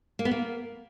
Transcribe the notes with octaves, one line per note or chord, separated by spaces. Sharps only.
A#3
B3
A#3